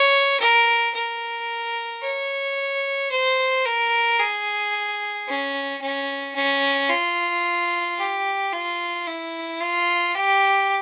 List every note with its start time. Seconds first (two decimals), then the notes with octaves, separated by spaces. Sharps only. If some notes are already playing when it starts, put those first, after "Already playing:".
Already playing: C#5
0.40 A#4
0.94 A#4
2.02 C#5
3.11 C5
3.65 A#4
4.19 G#4
5.27 C#4
5.81 C#4
6.35 C#4
6.89 F4
7.98 G4
8.52 F4
9.07 E4
9.60 F4
10.14 G4